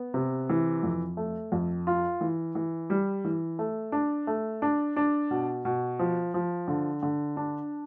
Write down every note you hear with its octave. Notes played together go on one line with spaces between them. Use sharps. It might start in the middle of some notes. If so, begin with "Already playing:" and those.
Already playing: B3
C3
E3
F2
A3
F2
F4
E3
E3
G3
E3
A3
D4
A3
D4
D4
B2
B2
F3
F3
D3
D3
D4